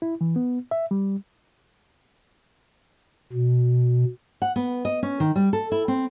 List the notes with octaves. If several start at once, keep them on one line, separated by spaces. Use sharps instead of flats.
E4
E3
B3
E5
G3
B2
F#5
B3
D#5
C#4
D#3
G3
A4
E4
C4